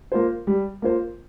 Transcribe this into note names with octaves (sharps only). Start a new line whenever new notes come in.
A#3 F4 C5
G3
A#3 F4 C5